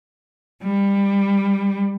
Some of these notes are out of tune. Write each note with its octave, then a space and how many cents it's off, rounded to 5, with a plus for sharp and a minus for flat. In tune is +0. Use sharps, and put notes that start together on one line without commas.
G3 +20